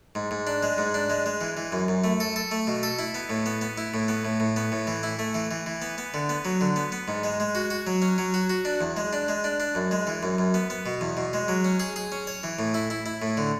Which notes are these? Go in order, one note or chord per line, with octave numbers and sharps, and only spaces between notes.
G#2
G#2
D4
G#3
G#2
D4
G#3
G#3
E3
E3
F#2
F#2
A3
A4
A4
A3
B2
A4
E4
B3
A2
B3
B3
E4
A2
B3
A2
A2
B3
A2
E3
E4
A3
E3
E3
E3
B3
B3
D3
B3
F#3
D3
B3
B3
G#2
G#3
G#3
F#4
F#4
F#3
C#4
F#3
F#4
F#4
D4
E2
G#3
D4
G#3
D4
D4
F#2
G#3
E3
F#2
F#2
B3
B3
B2
E2
B2
G#3
F#3
C#4
G#4
G#4
C#4
C#5
E3
A2
E4
E4
E4
A2
D3